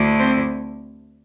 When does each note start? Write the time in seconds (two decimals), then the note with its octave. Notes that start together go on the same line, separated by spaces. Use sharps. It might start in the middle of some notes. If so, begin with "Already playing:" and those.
Already playing: D2 D3 A3 E4
0.18 C4 C5